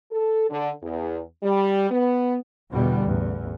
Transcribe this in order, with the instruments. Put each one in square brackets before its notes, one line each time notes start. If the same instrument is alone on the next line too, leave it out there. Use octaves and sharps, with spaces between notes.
[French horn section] A4
D3
E2
G3
B3
[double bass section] E2 B2 D3 G3 B3
A1 E2